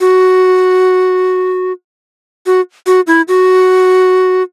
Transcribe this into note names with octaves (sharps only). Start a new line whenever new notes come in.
F#4
F#4
F#4
E4
F#4